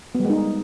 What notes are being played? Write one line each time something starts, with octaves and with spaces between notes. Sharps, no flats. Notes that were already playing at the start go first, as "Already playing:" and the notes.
B3
G3
G#3
D#4